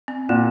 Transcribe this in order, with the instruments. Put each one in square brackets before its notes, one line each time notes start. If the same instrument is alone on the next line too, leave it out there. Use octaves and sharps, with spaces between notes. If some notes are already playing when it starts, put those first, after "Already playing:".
[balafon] C4
[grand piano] A#2 [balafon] A#3